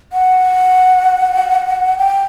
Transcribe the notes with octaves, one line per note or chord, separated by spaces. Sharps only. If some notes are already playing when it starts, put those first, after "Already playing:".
F#5
G5